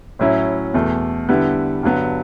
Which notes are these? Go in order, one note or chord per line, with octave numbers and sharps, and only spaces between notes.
A2 F#3 C#4 E4
E2 B2 A3
D3 G3 B3 E4
G2 D3 F#3 B3